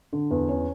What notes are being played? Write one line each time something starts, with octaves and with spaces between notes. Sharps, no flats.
D3
E2
C#4